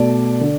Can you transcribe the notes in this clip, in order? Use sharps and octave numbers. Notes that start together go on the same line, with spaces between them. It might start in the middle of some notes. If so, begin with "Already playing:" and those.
Already playing: B2 A3 D5
D3